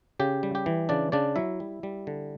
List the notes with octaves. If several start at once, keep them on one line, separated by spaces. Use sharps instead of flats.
C#3 G4
G3
G4
E3
C#3 D4 D5
C#3 D4 D5
F#3 E4 E5
G3
G3
D3